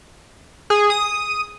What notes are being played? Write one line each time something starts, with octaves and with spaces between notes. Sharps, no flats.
G#4
D#6